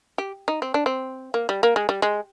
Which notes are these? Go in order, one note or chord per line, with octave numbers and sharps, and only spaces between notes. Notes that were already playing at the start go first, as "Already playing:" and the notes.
G4
D#4
C4
D4
C4
A#3
G3
A#3
G#3
G3
G#3